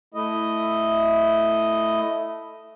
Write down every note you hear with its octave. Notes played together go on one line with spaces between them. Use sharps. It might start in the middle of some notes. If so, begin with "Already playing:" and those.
A3 E4 D#5